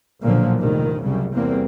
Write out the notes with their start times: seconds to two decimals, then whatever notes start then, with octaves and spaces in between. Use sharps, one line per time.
0.23 B1 A#2 D3 F3 F#3 A#3
0.59 F1 A#1 A#2 D#3
1.03 C2 F#2 C#3 G3
1.33 E2 G3 A#3 C4